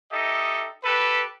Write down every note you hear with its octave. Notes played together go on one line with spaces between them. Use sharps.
D#4 G4 A4 D#5 E5
G4 A4 B4